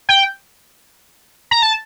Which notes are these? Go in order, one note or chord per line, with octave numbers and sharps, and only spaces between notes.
G5
A#5
A5